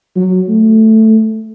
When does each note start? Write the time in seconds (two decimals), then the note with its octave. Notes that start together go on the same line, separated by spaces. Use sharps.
0.16 F#3
0.48 A3